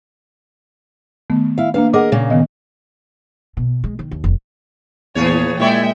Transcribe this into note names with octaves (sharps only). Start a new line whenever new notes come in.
D#3 A3 B3
E4 F5
A#3 D4 B4 F5
G#4 A#4 D#5 F#5 D6
A#2 C#3 A#3
D#3 B3 D#5
B2
G#3
D#3
D#2
F1
E2 A#2 E3 G#4 C#5 A6
A#2 G#3 E4 C#5 D5 E5 G5